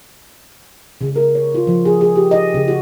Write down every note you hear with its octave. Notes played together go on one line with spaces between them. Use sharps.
C#3
A#4
C#5
F4
F3
G#4
G#4
G4
D#5
C#3
F#4